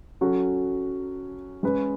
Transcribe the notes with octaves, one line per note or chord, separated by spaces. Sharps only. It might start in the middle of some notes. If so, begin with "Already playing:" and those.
F#3 C#4 F#4 A4
G#3 C#4 G#4 B4